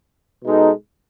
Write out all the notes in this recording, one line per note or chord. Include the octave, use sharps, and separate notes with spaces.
B2 G#3 D#4 A4